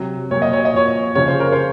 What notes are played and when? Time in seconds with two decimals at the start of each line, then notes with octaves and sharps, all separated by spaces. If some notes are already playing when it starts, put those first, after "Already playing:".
Already playing: C3 F#3
0.31 A#2 F#3 C#5
0.42 D#5
0.53 C#5
0.65 D#5
0.73 A#2 F3 C#5
1.15 C#3 F3 C#5
1.28 C5
1.40 A#4
1.52 C5